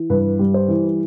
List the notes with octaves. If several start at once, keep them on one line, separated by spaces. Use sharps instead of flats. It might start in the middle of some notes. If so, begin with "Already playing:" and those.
Already playing: E3
G2 B4
G3
C5
E3